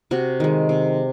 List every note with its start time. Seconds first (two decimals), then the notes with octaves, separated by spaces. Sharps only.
0.11 C3 F#4
0.40 D#3 G#3
0.69 C3